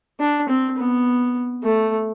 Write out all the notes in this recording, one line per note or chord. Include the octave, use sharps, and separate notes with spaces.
D4
C4
B3
A3